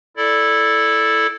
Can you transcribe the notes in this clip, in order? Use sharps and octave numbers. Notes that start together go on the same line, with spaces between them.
E4 A4 D5